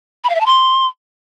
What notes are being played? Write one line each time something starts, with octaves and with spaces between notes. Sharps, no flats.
B5
F5
E5
A5
C6